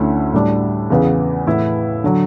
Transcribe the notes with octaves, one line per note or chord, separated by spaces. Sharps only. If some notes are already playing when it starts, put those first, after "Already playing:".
Already playing: D2 D3 A3 C#4 E4
A2 G3 D4
E2 C#3 E3 B3
A2 E3 B3 E4
D3 F#3